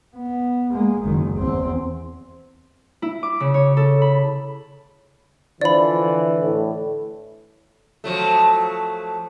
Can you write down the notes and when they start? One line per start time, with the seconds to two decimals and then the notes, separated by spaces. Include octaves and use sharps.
0.16 B3
0.72 G#3 A#3
1.04 F#1 D#3
1.39 E2 C4
3.02 E4
3.23 D6
3.40 C#3
3.54 C#5
3.77 A4
4.02 B5
5.61 D3 E3 F3 D5 B5
6.40 A2
8.04 F3 F#3 A3